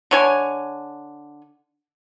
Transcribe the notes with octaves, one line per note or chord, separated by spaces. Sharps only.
D3 C#5 G#5